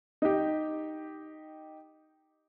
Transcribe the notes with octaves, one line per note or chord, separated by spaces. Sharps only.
D#4 G4